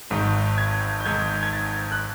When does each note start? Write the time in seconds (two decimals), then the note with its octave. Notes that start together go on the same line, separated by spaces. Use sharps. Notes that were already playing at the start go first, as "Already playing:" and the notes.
0.10 G#1 G#2 D#3
0.58 G#6
1.00 G6
1.05 G#1 G#2 D#3 G#6
1.43 G#6
1.53 A6
1.92 F#6